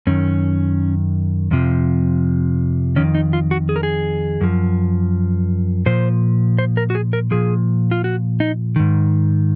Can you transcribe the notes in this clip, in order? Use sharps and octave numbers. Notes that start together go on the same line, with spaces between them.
F#2 D#3 C#4
F2 C3 F3
F2 D#3 C#4
D#4
F4
F#4
G#4
A#4
G#4
F#2 F3
A#2 F3 C5
C5
A#4
F#4
G#4
A#4
A#2 F3 G#4
F4
F#4
D#4
G#2 D#3